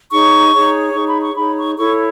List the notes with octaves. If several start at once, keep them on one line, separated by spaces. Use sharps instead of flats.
D#4 G#4 C#5 C#6
D#4 G#4 C#5
D#4 G#4 C#5 C#6
B5
C#6
D#4 G#4 C#5 B5
C#6
E4 A4 C#5 C#6